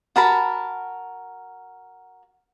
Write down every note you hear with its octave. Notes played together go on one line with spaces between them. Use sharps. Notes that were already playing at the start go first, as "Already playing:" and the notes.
F#4 A#4 A5 B5